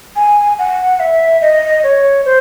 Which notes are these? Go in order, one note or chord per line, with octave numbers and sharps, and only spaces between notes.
G#5
F#5
E5
D#5
C#5
C5